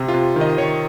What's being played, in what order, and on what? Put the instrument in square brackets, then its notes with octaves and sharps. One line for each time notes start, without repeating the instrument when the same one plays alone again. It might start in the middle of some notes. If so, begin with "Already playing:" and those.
Already playing: [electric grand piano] C3
F4
C3
D#3
D#5
D#3 C#5